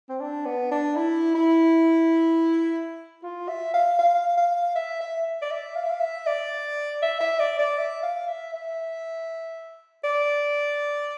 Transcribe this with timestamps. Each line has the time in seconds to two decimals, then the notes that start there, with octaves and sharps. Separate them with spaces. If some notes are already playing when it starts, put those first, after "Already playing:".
0.09 C4
0.20 D4
0.46 B3
0.71 D4
0.96 E4
1.35 E4
3.24 F4
3.49 E5
3.74 F5
3.99 F5
4.37 F5
4.76 E5
5.01 E5
5.42 D5
5.51 E5
5.76 F5
5.83 E5
5.91 F5
6.01 E5
6.27 D5
7.02 E5
7.20 E5
7.40 D5
7.59 D5
7.78 E5
8.03 F5
8.28 E5
8.54 E5
10.04 D5